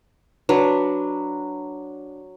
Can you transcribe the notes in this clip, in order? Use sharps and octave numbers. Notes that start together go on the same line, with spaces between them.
F#3 D4 B4